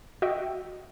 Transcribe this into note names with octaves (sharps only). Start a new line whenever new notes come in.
F#4 D#5 E5 G5